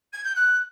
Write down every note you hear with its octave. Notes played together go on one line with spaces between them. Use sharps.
G#6
G6
F#6